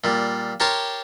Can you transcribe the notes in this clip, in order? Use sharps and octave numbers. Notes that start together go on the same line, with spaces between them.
A#2 G3
G4 A#4 C#5 A5 C6